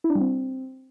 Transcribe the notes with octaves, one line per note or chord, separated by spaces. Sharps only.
E4
D4
G3
C4